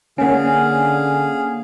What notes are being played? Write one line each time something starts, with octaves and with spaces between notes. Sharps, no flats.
D3 A#3 C#4 G#4 F5 F#5 G#5